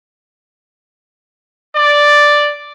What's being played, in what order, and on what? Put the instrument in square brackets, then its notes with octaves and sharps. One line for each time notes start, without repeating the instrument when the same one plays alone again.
[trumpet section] D5